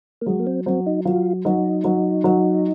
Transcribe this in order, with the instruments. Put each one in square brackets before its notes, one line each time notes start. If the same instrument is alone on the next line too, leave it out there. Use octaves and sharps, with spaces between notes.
[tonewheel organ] A#3
[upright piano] F#3 [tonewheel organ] G#3
[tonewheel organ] A#3
C4
[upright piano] F#3 [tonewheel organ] C4
[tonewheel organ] D#4
[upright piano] F#3 [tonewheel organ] F4
[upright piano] F#3 [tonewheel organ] D#4
[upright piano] F#3
F#3